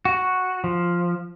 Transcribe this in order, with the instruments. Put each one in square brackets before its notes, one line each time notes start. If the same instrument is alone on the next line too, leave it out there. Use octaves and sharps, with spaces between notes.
[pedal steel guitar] F#4
F3